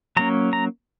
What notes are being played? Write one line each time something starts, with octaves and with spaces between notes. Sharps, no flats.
F#3 A#3 C#4 A#5
A#5